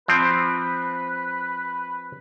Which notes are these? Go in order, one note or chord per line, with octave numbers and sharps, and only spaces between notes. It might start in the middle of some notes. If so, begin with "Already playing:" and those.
F3 C4 B4